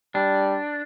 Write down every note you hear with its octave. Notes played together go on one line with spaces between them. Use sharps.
G3 D4